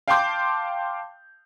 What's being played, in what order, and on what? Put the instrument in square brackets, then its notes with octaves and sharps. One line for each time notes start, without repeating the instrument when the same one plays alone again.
[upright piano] F5 G5 A5 C6 D6 G6